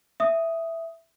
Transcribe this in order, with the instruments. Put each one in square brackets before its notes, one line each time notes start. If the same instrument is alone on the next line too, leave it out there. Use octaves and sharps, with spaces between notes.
[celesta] E5 D#6